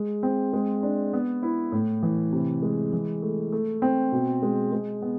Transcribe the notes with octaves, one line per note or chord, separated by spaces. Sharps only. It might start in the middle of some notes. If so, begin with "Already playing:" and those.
Already playing: G#3
C4
G#3
D4
B3
E4
A2
E3
C3
G#3
E3
A3
A3
C4
B2
G#3
G#3
B3